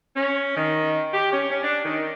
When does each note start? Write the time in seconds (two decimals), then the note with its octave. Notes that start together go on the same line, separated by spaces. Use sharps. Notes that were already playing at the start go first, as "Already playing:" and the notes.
0.16 C#4
0.57 D#3
1.13 G4
1.32 C#4
1.51 C#4
1.63 D4
1.85 D#3